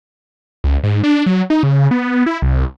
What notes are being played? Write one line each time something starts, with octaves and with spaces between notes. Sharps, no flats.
C#2
G#2
D4
F#3
D#4
C#3
B3
E4
C2